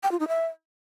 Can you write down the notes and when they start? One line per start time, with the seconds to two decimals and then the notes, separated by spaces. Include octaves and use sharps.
0.03 G5
0.11 F4
0.20 D#4
0.28 E5